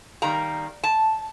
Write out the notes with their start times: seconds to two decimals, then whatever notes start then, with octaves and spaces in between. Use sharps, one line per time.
0.22 D#3 G3 A#3 A#5
0.84 A5